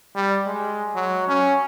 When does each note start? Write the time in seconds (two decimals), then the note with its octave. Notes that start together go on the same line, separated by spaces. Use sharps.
0.15 G3
0.47 G#3
0.95 F#3
1.28 C#4